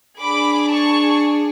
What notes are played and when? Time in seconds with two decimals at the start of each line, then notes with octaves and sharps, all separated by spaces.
0.18 D4 G#4 B5 D6
0.71 A5 C#6